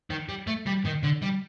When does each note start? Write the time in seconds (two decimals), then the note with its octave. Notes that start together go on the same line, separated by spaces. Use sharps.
0.10 D#3
0.29 G3
0.47 A3
0.66 G3
0.85 D#3
1.03 D3
1.22 G3